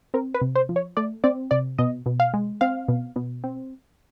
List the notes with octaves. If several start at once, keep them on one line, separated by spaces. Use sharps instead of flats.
C4 A#4
B4
C3
C5
F3
C#5
A3 D5
C4 D5
C3 D5
B2 D#5
B2
F5
G#3
C4 F5
B2
B2
C4